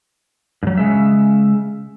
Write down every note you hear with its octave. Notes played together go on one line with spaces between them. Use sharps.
G2 F#3
C#3 G#3 E5